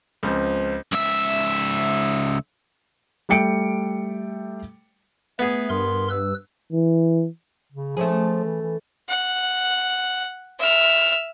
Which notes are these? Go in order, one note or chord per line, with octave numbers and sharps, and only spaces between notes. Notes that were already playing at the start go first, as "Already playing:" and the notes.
C#2 C#3 F3 C4
C#2 E5
G3 A3 G5 C#7 D7
A3 B3 G#4
G2 A#4 C6
B4 E6
E3
C#3
F3 A3 C#4 G#4
E3
E3
F#5
E5 F6